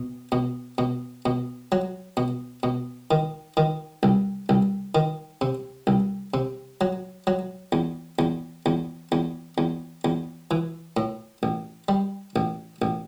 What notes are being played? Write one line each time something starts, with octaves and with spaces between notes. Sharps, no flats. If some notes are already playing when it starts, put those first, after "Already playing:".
Already playing: B2
B2
B2
B2
F#3
B2
B2
D#3
D#3
C2
C2
D#3
C3
C2
C3
F#3
F#3
E2
E2
E2
E2
E2
E2
E3
A2
A1
G3
A1
A1